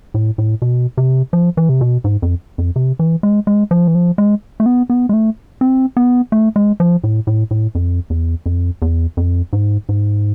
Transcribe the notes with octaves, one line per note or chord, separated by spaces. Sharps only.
A2
A2
B2
C3
F3
E3
C3
B2
G#2
F2
F2
C3
E3
G#3
G#3
F3
E3
F3
G#3
A3
B3
B3
G#3
A3
C4
B3
A3
G#3
F3
A2
A2
A2
F2
E2
F2
E2
F2
G#2
G#2